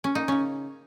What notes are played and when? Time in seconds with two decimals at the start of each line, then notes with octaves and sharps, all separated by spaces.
0.04 C#4
0.15 A#3 D#4
0.28 C#3 C#4